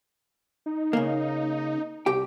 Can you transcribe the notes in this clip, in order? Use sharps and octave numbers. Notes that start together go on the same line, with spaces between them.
D#4
C#3 A#3
C2 G4 G5